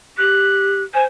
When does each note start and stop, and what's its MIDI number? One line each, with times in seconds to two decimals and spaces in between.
0.18 0.82 67
0.18 0.83 90
0.94 1.06 72
0.94 1.03 80